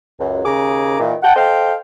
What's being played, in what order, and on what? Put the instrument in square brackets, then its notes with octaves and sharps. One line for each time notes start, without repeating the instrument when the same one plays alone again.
[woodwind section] C#2 F#2
D#2 C#3 G#4 A#5 D6
A#2 D#3 E3
F#5 G5 A5
A4 C5 D#5 F5 G5